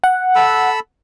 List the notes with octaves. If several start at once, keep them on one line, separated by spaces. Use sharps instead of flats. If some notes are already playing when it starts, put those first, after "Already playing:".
F#5
A4 B5 E6